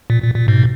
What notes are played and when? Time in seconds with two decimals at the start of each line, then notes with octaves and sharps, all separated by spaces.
0.10 A#2
0.22 A#2
0.35 A#2
0.48 G#2 B2